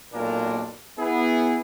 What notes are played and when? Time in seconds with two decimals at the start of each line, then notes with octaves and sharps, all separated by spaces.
0.14 B1 A#2 A#3 D4 A#4 G#5
0.99 B3 E4 G#4